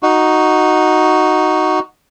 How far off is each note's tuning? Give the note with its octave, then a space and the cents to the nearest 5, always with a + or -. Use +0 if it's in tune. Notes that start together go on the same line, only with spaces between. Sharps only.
D#4 +0 F#4 +0